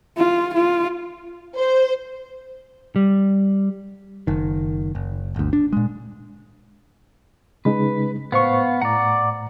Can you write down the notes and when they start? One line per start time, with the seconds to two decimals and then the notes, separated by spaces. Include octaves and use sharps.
0.17 F4
0.53 F4
1.58 C5
2.96 G3
4.27 F#1 D#3
4.95 F#1
5.36 G1 D2
5.53 D4
5.73 A#2 G#3
7.65 C#3 G#3 D#4 B4
8.32 A2 B3 C5 F5 C#6
8.82 A2 D5 F#5 A#5